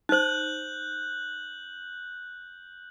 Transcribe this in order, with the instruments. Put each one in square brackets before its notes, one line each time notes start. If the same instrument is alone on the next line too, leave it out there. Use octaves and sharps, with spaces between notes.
[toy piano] D#4 C5 [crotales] F#6 G6 F#7